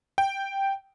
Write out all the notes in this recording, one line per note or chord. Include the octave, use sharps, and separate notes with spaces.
G5